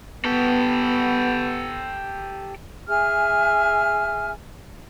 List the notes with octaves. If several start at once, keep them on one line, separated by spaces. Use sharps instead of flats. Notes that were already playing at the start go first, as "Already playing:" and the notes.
B3 G4 A4
G#4 E5 G#5 F6